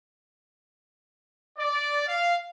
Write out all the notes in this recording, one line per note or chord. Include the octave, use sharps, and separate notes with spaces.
D5
F5